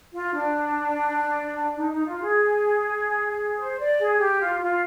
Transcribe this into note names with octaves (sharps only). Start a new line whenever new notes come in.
F4
D4
D#4
D#4
F4
G#4
C5
D5
G#4
G4
F4
F4